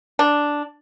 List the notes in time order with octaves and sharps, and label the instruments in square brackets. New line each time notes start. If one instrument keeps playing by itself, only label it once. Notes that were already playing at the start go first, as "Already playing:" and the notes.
[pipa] D4